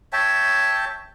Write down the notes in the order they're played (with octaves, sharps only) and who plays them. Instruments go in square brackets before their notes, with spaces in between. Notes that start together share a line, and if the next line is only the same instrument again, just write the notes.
[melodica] C#5 E5 G5 A5